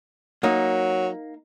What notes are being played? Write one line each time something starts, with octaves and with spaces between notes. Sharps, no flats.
F#3 A#3 D#4